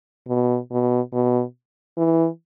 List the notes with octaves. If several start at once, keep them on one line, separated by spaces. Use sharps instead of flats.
B2
B2
B2
E3